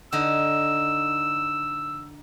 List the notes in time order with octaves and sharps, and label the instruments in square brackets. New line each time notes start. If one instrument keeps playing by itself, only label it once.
[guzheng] D3 D#4 [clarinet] E6